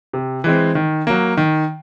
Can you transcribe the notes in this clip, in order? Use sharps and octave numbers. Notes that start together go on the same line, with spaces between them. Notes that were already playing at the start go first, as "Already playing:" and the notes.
C3
E3 G#3 C4
D#3
F#3 A#3
D#3